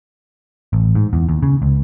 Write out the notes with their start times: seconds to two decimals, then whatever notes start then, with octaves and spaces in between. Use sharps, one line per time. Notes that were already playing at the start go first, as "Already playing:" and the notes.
0.73 A1
0.95 G#2
1.13 E2
1.29 D#2
1.43 C#3
1.62 C#2